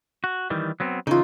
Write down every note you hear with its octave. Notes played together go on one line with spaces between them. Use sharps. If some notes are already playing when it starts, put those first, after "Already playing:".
F#4
D#3 E3 G3
F#3 B3 C4
C#3 E3 D#4 F4